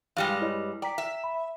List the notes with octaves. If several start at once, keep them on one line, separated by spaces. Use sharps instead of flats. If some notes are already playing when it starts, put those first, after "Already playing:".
G2 G3 G#3 F5 G5
E4 C#5 D#5
D5 G5 A#5 B6
E5
B5